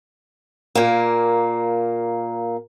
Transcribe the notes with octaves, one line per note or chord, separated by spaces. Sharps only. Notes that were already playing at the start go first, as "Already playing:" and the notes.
A#2 A#3